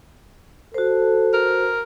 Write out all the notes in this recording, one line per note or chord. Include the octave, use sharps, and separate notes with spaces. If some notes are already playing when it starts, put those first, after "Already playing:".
F#4 A4 C5
A#4